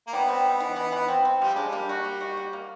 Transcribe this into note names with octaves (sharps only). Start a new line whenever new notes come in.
A#3
G3 B3
C4
G3
E3
E3
E3
C4
C4
F3 G3
G#3 D4
G3 A#3
F#4
A#3
F#4
F#4
A#3